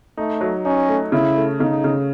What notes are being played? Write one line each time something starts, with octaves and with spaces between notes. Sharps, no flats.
A3 D#4
F#3
C#4 D#4
A3
C#3 E4
A3
C#3 D#4
C#3